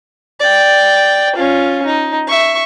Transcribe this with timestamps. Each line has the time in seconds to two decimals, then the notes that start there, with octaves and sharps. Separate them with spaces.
0.40 D5 G5
1.36 C#4 F4
1.86 D#4
2.28 E5 C#6